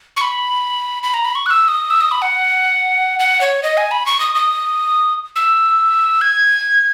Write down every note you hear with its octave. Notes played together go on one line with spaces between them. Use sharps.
C#6
B5
B5
A#5
B5
C#6
F#6
E6
D#6
E6
D#6
B5
F#5
F#5
C#5
D#5
G#5
B5
C#6
D#6
D#6
E6
G#6